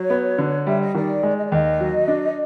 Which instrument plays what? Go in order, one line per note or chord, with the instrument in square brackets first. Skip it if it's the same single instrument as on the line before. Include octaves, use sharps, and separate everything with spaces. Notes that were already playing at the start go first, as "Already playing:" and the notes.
Already playing: [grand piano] F#3 [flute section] C#5
[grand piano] B3
D3
[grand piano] G3 [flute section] E5
[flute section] D#5
[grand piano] D#3 [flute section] D5
[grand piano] G#3
[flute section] D#5
D5
[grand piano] D#2 [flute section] D#5
[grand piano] F#3
D4